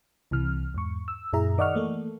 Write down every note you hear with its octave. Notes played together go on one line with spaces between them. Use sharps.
C2 C3 E3 F6
E2 G#2 C#6
E6
F#2 A#2 E4 G#4 E5 A#5
D#3 D5 D#5 F#5 C#6 F6
E3 A3 A#3 A4